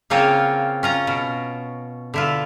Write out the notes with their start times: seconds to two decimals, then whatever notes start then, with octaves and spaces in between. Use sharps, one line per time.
0.10 C#3 A#3 C4 F4 C#5
0.83 C#4 F4 A#5
1.07 B2
2.14 D3 E4 F4